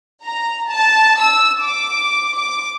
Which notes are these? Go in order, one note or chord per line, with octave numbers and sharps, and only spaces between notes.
A#5
A5
E6
D6
D6